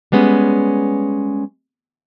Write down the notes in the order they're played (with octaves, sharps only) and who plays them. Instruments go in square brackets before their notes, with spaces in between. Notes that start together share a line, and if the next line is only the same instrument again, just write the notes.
[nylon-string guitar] G3 G#3 B3 C#4